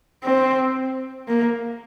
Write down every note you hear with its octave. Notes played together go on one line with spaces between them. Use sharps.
C4
A#3